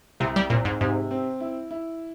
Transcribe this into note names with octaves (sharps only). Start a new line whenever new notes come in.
C2 C3
G3
A#2 C4
G#2
G#2 C3
C4
E4
E4